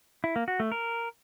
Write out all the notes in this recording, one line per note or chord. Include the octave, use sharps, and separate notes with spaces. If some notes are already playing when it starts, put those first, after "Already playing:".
E4
A#3
F#4
A3
A#4